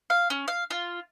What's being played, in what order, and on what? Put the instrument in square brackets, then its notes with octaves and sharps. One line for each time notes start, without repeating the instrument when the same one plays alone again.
[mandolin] F5
C#4
F5
F4